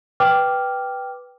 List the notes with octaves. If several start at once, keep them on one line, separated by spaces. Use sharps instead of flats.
B4 G5 D6 F6